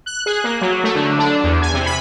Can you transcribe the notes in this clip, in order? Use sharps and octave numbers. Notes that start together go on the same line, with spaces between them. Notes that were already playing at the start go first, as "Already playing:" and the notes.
F#6
G#4
A#3
F#3
A3
D3
D4
E2
G#5
C3
B5